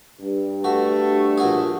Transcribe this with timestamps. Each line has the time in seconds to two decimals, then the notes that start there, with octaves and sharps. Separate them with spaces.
0.20 G2
0.64 A3 F#4
1.38 A#1 F#4 G#4